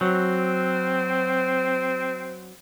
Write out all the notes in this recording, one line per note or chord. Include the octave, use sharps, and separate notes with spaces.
F#3 C4